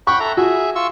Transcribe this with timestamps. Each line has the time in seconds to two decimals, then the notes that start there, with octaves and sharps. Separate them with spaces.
0.07 F#5 G5 B5 C#6
0.20 A4 E5 A#5
0.37 F#4 G#4 E5
0.76 F4 C#6 E6